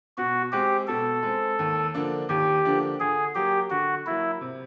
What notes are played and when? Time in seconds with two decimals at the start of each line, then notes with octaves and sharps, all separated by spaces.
0.18 B2 F#4
0.52 G#3 C4 G4
0.87 B2 A4
1.23 G#3 C4
1.59 D#2
1.94 D3 F3 A#3 D4
2.29 D#2 G4
2.65 D3 F3 A#3 D4
3.00 D3 G#4
3.35 F#3 A#3 G4
3.70 D3 F#4
4.06 F#3 A#3 E4
4.41 C3